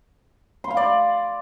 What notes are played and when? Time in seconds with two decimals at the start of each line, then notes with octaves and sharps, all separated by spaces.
0.64 C6
0.70 F5
0.77 D5